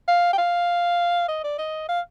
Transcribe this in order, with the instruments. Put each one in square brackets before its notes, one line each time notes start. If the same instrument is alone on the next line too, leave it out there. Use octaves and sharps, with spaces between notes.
[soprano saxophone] F5
G5
F5
D#5
D5
D#5
F5